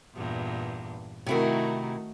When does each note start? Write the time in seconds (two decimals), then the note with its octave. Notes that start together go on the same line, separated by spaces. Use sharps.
0.15 E2 G2 A#2
1.26 C3 D#3 A3 E4 F#4 A#4